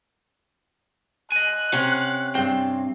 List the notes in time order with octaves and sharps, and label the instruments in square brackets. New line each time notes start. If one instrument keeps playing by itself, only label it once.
[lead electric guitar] D#5 G#5 [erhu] F#6
[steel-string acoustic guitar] C3 C#4 F5 [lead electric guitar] F#5
[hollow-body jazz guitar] G2 G5 [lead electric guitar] C4